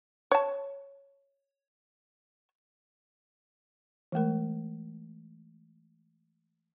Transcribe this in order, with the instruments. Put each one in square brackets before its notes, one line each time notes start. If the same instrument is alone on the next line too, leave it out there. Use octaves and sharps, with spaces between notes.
[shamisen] C#5 A5
[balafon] E3 G#3 A3 A#4